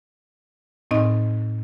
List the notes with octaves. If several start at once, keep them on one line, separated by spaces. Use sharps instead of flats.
A2 C4 D#4 D#5